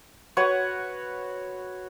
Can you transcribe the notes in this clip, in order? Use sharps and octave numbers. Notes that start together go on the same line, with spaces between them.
F#4 B4 C#5 F#5